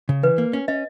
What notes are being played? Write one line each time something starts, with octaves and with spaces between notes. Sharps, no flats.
C#3
E3 B4
A#3
C#4
C#4 D#5